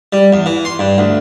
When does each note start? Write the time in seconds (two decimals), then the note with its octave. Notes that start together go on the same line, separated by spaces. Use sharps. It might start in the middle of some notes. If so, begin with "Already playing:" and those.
0.13 G3
0.33 E2
0.46 E3
0.65 C6
0.79 G2
0.98 D2